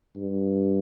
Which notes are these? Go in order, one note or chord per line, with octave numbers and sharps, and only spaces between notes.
G2